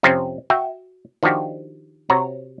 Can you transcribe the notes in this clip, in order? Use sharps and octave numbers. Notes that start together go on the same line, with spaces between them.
F2 C3 F3 C4 C#4
F#4 E5 G5
D#3 F3 D4 F#4 G4
C3 F#4 C#5 A#5